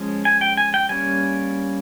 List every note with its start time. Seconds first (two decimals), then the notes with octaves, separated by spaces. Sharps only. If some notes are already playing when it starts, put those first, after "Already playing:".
Already playing: F3 G#3 C#4
0.25 G#5
0.41 G5
0.57 G#5
0.74 G5
0.89 G3 A#3 C#4 G#5